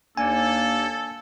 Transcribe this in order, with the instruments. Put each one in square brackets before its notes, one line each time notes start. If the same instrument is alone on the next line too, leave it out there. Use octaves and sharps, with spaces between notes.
[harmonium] D#2 D4 [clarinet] A#3 [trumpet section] A4 [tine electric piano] G#5